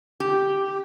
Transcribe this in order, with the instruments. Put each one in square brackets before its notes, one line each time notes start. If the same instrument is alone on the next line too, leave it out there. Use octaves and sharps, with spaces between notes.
[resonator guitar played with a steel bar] G4